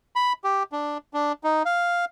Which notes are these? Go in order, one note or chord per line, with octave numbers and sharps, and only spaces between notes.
B5
G4
D4
D4
D#4
F5